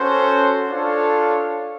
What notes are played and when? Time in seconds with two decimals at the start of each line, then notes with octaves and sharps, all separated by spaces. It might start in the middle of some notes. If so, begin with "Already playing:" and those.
Already playing: C#4 F#4 A4 C5
0.68 D4 F4 A4 C#5 F5